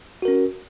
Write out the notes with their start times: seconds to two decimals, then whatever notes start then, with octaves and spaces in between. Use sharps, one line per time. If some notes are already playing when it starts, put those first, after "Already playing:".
0.22 F#4
0.25 A#4
0.28 C#4